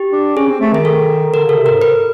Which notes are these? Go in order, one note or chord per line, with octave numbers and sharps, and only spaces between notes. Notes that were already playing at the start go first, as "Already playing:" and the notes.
Already playing: G4
D4
C#4 G#4
C4
A3
D#3 G#4
A4
D3 A#4
C#3 A4
C3
G#2 A#4
B4